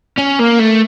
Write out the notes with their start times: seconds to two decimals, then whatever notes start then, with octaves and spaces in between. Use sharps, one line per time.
0.18 C#4
0.40 A#3
0.60 A3